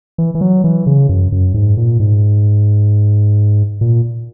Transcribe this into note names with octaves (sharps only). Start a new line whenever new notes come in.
E3
E3
F#3
E3
C#3
F#2
F#2
G#2
A#2
G#2
A#2